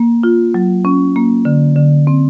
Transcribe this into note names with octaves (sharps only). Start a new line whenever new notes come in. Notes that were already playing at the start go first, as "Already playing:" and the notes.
Already playing: A#3
F4
F#3
C#4
A#3
D3
D3
C4